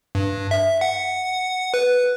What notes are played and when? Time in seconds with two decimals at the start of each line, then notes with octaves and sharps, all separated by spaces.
0.15 G2
0.51 E5
0.81 F#5
1.74 B4